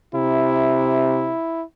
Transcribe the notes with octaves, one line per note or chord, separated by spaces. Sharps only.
C3 E4